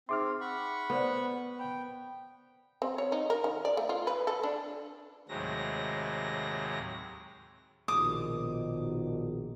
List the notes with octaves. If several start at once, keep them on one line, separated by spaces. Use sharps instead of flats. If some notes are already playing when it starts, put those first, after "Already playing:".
C4 D#4 G#4 E5 C6 D6 F6
F#5 B5 C#6
B3 A#4 C5 D5
G5 B5
C4
C#5
D#4
A#4
D#3
D5
A3
F4
B4
A4
D4
D#2 A2 C3 F#3 G#3 A#6
A#1 B2 D#3 D6 D#6